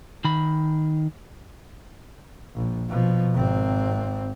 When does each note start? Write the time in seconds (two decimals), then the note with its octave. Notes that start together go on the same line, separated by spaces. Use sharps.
0.24 D#3 B5
2.55 A#1
2.89 B2 F3
3.35 G#1 C4